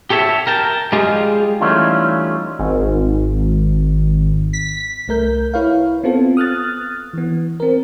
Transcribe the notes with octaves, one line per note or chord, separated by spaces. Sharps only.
G4 A4 C#5 E5
A#4 G5 A5
G3 G#3 F4 G4 G#4
E3 G3 A3 C#4 D#4 F4
G#1
B6
C2 A3 A#4 G6
E4 B4 C#5 F5
B3 C4 F4 A4
D#6 F6 F#6 A6
E3 B3
C4 A#4